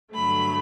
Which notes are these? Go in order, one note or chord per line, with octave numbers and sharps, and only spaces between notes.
G2 D3 F#3 A3 B5